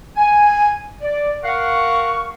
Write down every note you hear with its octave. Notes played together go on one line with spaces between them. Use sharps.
G#5
D5
A#4 F5 F#5 C#6